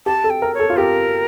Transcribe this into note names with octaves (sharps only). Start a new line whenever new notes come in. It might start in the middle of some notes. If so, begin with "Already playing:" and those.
G4 A5
A4
G5
A#4
C#5
A4
F4
G4 A#4